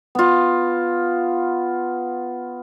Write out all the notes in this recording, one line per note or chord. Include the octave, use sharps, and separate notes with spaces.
B3 F4